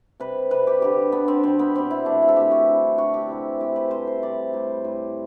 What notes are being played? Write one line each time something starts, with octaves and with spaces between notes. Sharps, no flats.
C3 G3 B4
C3 G3 B4
G4
D3 G3 G4
D3 G3 B3
C4
B2 G3 C4
B3
B2 G3 C4
E4
C3 E3 A3 D4
E4
A4
C3 E3 A3 G4
F#4
D3 G3
D3 G3 F#4
G4
C3 E3 A3
C3 E3 A3 G4
B4
C3 G3 C5
C5
C3 G3 D5
A2 G3
A2 G3